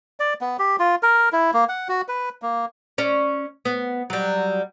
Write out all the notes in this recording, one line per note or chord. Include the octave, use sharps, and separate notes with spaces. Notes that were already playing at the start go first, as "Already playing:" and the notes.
D5
B3
G4
F4
A#4
E4
A#3
F#5
F#4
B4
A#3
C#4 D5
B3
F#3 G3